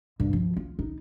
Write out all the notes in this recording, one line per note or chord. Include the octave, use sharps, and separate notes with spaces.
G2
F3
F4
D#4